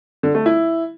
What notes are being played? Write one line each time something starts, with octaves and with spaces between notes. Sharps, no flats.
D3
A3
E4